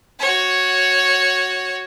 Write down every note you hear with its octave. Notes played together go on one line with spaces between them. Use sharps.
F#4 C#5